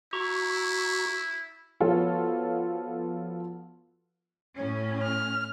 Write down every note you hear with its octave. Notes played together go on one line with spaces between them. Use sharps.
E4 F#4 A#5 C#6
F3 B3 F4 F#4 A4 C#5
A2 C#4
F6